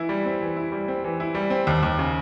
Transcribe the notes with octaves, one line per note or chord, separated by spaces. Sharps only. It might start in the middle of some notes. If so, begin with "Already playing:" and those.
Already playing: E3 E4
G3
C4
E3
E4
G3
C4
E3
E4
G3
C4
D#2
D#2
C#3